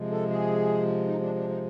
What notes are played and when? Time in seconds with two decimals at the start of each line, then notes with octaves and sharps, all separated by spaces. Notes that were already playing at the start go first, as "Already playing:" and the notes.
Already playing: C3 F3 G#3
0.11 A4
0.30 G#4
1.07 D#4
1.21 D4
1.36 D4
1.49 D#4